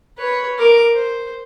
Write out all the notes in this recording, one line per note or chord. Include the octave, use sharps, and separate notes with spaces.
B4 C#5
A#4 D6
C5